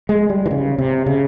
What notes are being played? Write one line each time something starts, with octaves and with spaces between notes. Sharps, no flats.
G#3
G3
E3
C#3
C3
C#3